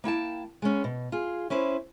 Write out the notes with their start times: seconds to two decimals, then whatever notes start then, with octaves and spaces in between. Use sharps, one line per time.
0.04 A#3 E4 G5 A5
0.62 G#3 B3 C#4
0.84 B2
1.12 F4 G#4
1.50 C#4 E4 B4 C5